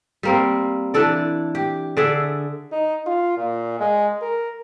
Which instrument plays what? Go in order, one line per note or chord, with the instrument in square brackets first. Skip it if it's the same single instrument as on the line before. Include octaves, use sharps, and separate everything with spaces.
[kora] G3 A#3 C4
E3 D4 A4 D5
G4
D3 G#4 D5 E5
[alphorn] D#4
F4
A#2
G#3
A#4